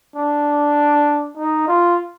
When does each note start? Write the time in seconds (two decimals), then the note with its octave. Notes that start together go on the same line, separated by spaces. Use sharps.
0.16 D4
1.37 D#4
1.68 F4